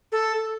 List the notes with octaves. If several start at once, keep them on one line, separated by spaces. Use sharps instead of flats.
A4